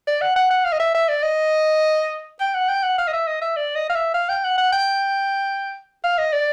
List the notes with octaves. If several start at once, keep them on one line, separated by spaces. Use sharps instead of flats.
D5
F#5
F#5
F#5
F5
D#5
E5
E5
D5
D#5
G5
F#5
G5
F#5
F5
D#5
E5
D#5
E5
D5
D#5
F5
E5
F5
G5
F#5
F#5
G5
F5
D#5
D5